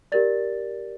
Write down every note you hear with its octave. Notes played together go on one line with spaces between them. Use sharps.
G4 A#4 D5 A6